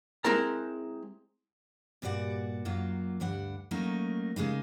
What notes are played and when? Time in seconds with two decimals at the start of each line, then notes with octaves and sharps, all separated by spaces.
0.24 G#3 C4 E4 A#4 A#5
2.02 G2 A#2 F#4 D5 F#5
2.65 F#2 F#3 A#3 F4
3.20 D2 G2 D4 F#5
3.71 F#3 A3 A#3 C#4 D#4 A#4
4.36 C#3 G#3 A#3 D#4